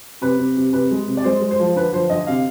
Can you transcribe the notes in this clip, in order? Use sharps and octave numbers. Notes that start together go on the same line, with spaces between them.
C3 B4
C3
C3
C3 B4
G#3
C3
D5
G#3 C5
G#3
C5
F3
D3 B4
F3 C5
D3 D#5
C3 F5